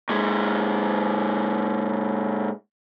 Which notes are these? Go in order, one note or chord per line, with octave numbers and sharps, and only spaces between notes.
A#2 G#3